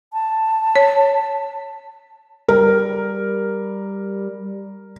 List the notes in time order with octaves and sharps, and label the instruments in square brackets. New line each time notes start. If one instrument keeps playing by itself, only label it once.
[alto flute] A5
[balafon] C#5
[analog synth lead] G3 [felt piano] A#4